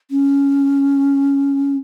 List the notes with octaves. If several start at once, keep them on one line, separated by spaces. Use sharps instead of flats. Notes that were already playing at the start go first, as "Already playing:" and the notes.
C#4